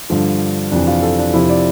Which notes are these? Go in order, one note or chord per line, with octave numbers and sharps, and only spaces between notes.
G2 D3 F3 A4
F2 C3 E3 D4
F4
A4
D4
F2 C3 F3 E4
D5